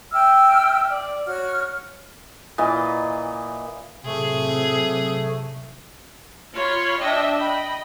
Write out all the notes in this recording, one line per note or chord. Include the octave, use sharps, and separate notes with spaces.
E5 G5 E6 F6
D5
F#4 C#5 F6
A#2 E3 D#5
A2 C3 F#3 A3 G#4
F4 C#5 B5 C6
D4 D#5 E5 G5
D#5 G5 B5